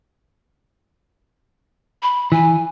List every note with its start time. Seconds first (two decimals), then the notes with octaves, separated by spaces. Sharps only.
2.03 B5
2.32 E3 G#5